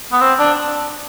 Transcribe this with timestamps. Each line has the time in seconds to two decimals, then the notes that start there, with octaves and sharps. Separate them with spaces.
0.13 B3
0.21 C4
0.39 D4